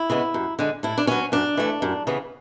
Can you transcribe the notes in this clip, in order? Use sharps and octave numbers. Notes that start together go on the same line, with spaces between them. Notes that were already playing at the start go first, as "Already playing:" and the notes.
Already playing: E4
C#3 G#3 B3
F#2
D3 G#3
A2 E4
D4
F#3 B3 C#4
F#2 D4
E3 A3
F#2
C#3 E3 B3